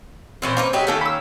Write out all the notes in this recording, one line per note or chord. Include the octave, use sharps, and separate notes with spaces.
A#2 E3 C4 C#4 A#4 C5
A#3 D#4 B4
F#3 D#4 G4 G#4 E5
D#3 A3 A#3 C#4 A4
B5 E6